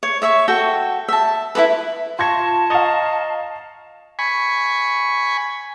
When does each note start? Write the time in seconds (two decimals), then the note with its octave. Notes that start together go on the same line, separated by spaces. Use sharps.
0.03 C#5
0.22 C#5 E5 C#6
0.48 F#4 A4 G5
1.08 E5 A5
1.55 E4 F4 A4 B4
2.19 F4 A5 C6 C#6 G#6 A#6
2.70 D#5 F5 A#5 C#6 A6
4.19 G#5 B5 C#6